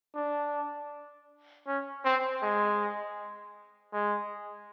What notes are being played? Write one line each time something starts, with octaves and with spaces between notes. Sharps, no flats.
D4
C#4
C4
G#3
G#3